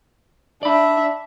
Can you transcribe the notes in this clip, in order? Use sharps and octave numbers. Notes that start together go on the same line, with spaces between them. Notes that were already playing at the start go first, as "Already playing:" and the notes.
D4 D5 E5 B5